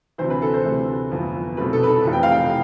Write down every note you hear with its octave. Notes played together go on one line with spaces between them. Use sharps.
D2 C3 E3 C5
B4
A4
C5
D2 C3 E3 A3
G1 F2 E3 B3
C2 B2 A3 C4 B4
A4
B4
A4
F1 F2 C3 E3
G5
F5
G5